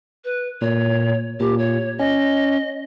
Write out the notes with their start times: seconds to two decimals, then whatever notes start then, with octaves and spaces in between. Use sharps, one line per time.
0.25 B4
0.61 A#2 C#5
1.40 A#2 G4
1.58 C#5
1.99 C#4 D#5